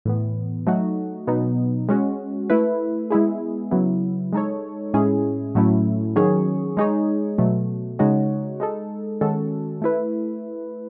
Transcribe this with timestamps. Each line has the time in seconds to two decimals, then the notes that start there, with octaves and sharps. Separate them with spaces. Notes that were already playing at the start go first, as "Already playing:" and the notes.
0.05 A2 E3 B3
0.67 F#3 A3 D#4 F#4
1.27 B2 F#3 B3 D#4
1.89 G#3 C#4 F#4
2.50 A3 E4 B4
3.10 G#3 B3 E4 G#4
3.71 C#3 F#3 B3 E4
4.33 G#3 D#4 A4 C#5
4.94 A2 G#3 C#4 E4 G#4
5.55 A2 F#3 A3 C#4 E4
6.16 D#3 F#3 C#4 G#4 C#5
6.77 G#3 D#4 G#4 C#5
7.38 B2 F#3 A3
7.99 C#3 G#3 D#4 F#4 C#5
8.60 G#3 D#4 A4
9.21 D#3 G#3 C#4 F#4 A4
9.82 A3 E4 B4